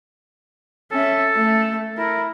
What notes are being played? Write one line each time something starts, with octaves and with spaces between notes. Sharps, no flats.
C#4 A4 E5
A3
E4 A#4